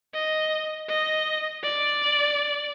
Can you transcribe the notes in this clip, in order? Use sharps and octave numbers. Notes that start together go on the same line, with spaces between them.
D#5
D#5
D5